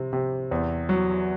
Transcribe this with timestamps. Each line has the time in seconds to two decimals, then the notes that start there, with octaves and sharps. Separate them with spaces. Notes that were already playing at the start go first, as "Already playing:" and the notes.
Already playing: C3
0.13 C3
0.51 E2
0.89 F#3